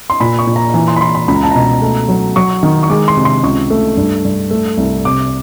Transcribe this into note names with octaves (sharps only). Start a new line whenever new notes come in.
C6
A#2 B5
C#6
A#2
A#5
E3 A#5
C6
B5
E3 C6
B5
C#2 B5
A#5
A5
B2 A#5
A3
F#3
F#3 C#6
D#3
C#6
G#3 D6
C6
C3
C6
C#2 C#6
A3
G2
G2
A3
C2
C3 D6